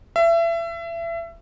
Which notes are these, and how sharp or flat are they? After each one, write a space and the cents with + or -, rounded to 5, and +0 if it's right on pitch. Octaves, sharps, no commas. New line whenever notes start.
E5 +30